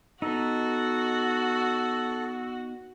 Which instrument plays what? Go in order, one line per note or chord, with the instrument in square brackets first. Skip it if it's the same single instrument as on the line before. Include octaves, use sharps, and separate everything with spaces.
[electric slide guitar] B3 D#4 [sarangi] F#4 [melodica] A4